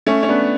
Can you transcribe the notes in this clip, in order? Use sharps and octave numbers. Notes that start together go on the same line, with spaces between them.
A3 C#4
C#4
B3 D4